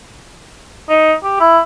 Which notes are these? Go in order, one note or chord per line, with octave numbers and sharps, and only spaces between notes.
D#4
G4
E4